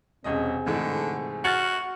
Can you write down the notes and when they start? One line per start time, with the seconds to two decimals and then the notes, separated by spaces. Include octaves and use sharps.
0.24 E1 C3 C4 C#4 G#4 D#5
0.66 G#2 D3 E3 A3
1.44 F#4 F6 A6 C#7